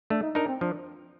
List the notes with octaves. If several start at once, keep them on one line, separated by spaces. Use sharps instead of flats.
A3 D4
D#4
D4 D#4 A#4
C4
F3 D4